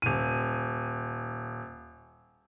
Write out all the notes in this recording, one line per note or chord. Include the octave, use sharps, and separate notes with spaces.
D#1 D#7